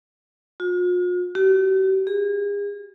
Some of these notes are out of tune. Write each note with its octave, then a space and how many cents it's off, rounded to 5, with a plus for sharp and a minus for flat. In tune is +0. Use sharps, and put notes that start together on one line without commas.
F4 +45
G4 -45
G#4 -40